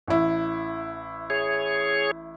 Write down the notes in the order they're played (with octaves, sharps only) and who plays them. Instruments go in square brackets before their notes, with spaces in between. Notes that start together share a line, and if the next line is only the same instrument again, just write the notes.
[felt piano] A1 E4
[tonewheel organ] G#4 C#5